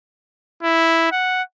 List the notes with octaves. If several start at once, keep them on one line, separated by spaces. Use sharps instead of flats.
E4
F#5